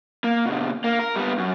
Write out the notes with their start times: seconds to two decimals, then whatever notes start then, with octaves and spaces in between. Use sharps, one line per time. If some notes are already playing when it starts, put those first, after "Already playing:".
0.24 A#3
0.46 B2 D3
0.84 A#3
0.99 A#4
1.16 G3 B3
1.38 F#2